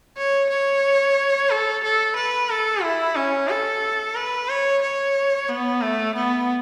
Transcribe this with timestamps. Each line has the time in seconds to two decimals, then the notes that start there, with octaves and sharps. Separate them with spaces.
0.18 C#5
0.50 C#5
1.51 A4
1.84 A4
2.16 B4
2.50 A4
2.83 E4
3.16 C#4
3.49 A4
4.16 B4
4.49 C#5
4.82 C#5
5.49 B3
5.82 A3
6.15 B3